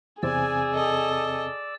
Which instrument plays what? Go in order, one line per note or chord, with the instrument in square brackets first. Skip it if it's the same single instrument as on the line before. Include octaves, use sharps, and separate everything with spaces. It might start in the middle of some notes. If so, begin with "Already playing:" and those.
[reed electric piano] E2 C3 C4 [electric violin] G#4 [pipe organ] D5 E6 [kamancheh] G#5
[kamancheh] A4 D#5